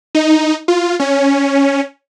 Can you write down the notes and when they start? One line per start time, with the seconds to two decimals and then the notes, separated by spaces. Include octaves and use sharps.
0.15 D#4
0.68 F4
1.00 C#4